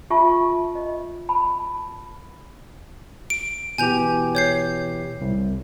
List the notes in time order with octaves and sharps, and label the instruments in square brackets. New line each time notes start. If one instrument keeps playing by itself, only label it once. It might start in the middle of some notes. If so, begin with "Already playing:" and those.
[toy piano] F4 E5 A5 C#6
D#5
A5 B5
[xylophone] D7
[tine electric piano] B2 E3 G4 [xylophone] G#5 G6 F7
[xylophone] C#5 G6 C7
[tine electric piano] C2